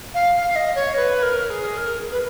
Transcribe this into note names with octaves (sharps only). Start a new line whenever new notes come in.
F5
F5
F5
D#5
C#5
B4
A#4
G#4
A#4
B4